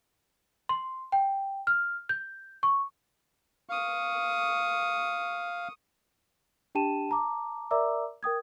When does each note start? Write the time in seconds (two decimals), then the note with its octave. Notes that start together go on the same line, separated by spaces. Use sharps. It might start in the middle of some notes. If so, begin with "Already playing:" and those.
0.69 C6
1.12 G5
1.67 F6
2.09 G6
2.63 C#6
3.69 F5 C#6 D#6
6.75 D4 G4 G5 A5 D#7 E7
7.09 A5 A#5 D6
7.71 A#4 D5 E5 A#5 D6 E6
8.23 A#4 G5 D#6 G#6